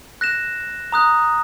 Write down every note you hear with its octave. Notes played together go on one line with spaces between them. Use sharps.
F#6 A#6 E7
A#5 D#6 F#6